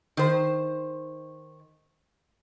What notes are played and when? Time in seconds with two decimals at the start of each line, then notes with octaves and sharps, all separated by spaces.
0.17 D#3 C5